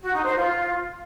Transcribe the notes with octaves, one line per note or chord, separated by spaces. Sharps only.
F#4
D#4
C5
F4